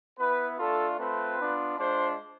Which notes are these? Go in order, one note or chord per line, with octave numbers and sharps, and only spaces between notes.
B3 E4 B4
A3 D4 F4 A4
A3 C4 F4 B4
B3 D4 F4
G#3 D4 F4 C5